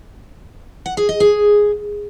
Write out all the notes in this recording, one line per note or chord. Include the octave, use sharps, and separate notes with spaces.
F#5
G#4
D#5
G#4